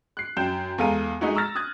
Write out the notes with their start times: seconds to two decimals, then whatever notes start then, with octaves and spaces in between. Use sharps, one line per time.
0.17 F#6 C7
0.37 F#2 G5 G6 E7
0.78 E2 G#3 A4 F5 A#5 D#7
1.21 G#3 A3 D#4 E4 F#4
1.35 A#5 C#6 E6 F6 A6 A#6
1.55 D#6 F#6 G#6 A6